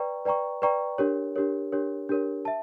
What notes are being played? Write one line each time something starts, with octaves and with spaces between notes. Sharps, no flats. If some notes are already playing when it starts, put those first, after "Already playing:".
Already playing: B4 D5 G5 A#5 C#6
B4 D5 G5 A#5 C#6
B4 D5 G5 A#5 C#6
D4 G4 A#4 C#5
D4 G4 A#4 C#5
D4 G4 A#4 C#5
D4 G4 A#4 C#5
E5 A5